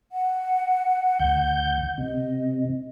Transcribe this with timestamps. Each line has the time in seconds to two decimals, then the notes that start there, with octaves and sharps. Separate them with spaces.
0.12 F#5
1.19 D2 G6
1.98 C3 D#5